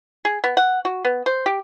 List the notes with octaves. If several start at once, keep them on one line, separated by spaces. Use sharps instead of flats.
G#4
B3
F#5
F#4
B3
C5
G4